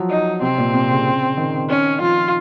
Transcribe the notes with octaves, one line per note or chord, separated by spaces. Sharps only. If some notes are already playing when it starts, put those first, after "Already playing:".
Already playing: F3 F#3
D#4
C3 C4
A#2
C3
C#3
D#3
C#4
F3 F4